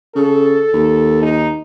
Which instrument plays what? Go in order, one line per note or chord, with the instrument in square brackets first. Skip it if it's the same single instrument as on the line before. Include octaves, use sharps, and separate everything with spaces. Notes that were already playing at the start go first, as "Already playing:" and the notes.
[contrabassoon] C#3 [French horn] A4
[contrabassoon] D#2
[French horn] D#4